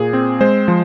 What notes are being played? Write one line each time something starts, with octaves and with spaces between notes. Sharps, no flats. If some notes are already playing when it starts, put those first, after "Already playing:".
Already playing: A#2 G#4
C4
G#3 C5
F3